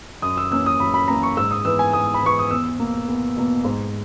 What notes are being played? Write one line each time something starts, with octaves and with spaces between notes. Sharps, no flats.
F#2 D#6
E6
E3 A#3 C#4 E6
D#6
F#2 B5
B5
E3 A#3 C#4 A#5
C#6
G#2 E6
D#6
E3 B3 E6
G#5
G#2 D#6
B5
E3 B3 C#6
D#6
E2 E6
B2 A#3
E2
B2 A#3
G#2